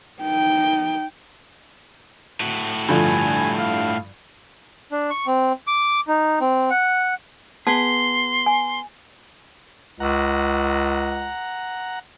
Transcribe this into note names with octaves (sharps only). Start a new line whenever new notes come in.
D#4 G5
A2 F#4
G2 D3 F3 G#5
F5
D4
C#6
C4
D6
D#4
C4
F#5
B3 G#4 A5 C6
G#5
C#2 F#5 A#5